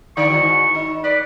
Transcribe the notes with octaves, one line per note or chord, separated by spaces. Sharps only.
D3 D5 C#6
G#2 D#3 F#4
D#4
B4 D5